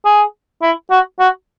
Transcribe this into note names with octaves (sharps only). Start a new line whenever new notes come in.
G#4
E4
F#4
F#4